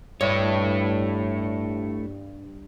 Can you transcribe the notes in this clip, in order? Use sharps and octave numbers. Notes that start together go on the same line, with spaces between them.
G2 A3 E4 C#5